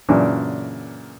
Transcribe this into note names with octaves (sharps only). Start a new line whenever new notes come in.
F#2 A#2 C#3 E3 D4